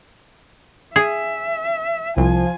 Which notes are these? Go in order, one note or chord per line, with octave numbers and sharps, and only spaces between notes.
G#4 E5
C2 F3 F4 G#5